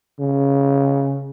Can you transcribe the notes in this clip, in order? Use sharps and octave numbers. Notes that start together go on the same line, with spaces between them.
C#3